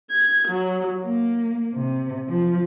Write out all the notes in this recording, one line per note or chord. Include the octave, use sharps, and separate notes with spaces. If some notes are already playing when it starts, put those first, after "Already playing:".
G#6
F#3
A#3
C3
F3